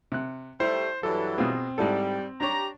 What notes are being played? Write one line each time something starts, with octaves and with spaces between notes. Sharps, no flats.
C3 F#6
G3 A3 E4 C5
G2 E3 F#3 A4
B2 C4 F4 G#4
G#2 G3 E4 A4
D4 G4 C#5 A#5